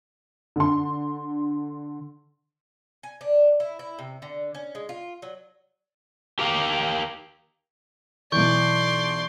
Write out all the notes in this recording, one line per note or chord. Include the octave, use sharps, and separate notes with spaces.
D3 C6
G#5
D4
E4
E4
C3
D3
C#4
G#3
F4
F#3
G4 A#4 F5 G5
B1 E3 D5 C6 C#6 G6